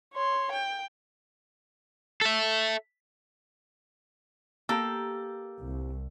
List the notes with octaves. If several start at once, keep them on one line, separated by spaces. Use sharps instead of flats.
C#5 C6
G5
A4 E5
A#3 G4 A4 A#5
C2